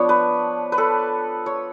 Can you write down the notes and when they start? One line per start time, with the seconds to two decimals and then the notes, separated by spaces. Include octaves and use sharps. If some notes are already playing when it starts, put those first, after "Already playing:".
Already playing: F3 B3 D4 C#5
0.09 B4
0.72 B4
0.78 A4
1.46 C#5